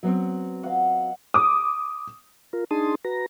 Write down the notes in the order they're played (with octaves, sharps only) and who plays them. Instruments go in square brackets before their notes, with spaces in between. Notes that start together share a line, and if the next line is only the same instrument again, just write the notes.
[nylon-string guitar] F#3 B3 C4
[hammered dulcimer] D#5 F5 F#5
[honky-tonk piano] D6 D#6
[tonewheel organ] F4 A#4
D4 D#4 G#4 A5 C6 D#6
F#4 B4 A#5 A#6